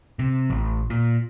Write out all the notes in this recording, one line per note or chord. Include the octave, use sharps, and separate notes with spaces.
C3
A1
A#2